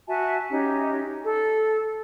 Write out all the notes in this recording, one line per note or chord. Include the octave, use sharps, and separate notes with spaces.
F#4 E5 G#5 A5
C#4 D#4 G4
A4